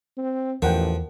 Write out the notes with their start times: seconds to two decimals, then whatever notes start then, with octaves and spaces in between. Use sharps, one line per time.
0.17 C4
0.62 A1 E2 F3 A#4 F#5 G5